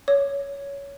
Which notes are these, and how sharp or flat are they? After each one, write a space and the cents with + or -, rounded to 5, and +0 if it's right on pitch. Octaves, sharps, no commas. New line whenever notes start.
C#5 +15